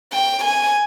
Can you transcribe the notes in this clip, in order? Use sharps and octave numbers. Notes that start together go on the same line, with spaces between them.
G5
G#5